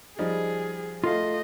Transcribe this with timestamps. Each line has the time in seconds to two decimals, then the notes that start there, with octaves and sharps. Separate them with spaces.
0.19 F3 G3 D#4 G#4
1.04 A3 F4 D#5 F5